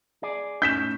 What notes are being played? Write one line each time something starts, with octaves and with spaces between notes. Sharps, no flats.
G#4 D5
A2 C#4 D#4 G6 B6 E7